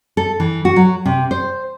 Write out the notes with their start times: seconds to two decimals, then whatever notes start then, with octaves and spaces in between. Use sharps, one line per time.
0.17 A4
0.40 E3
0.65 F#4
0.76 F#3
1.05 C3
1.31 C5